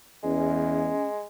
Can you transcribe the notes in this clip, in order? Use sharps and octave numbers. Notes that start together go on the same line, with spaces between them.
E2 G#3 C#4